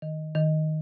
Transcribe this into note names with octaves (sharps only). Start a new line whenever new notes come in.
D#3
D#3